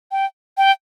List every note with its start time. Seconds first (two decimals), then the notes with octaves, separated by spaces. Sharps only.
0.11 G5
0.57 G5